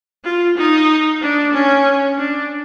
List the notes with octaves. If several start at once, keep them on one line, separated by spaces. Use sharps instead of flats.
F4
D#4
D4
C#4
D4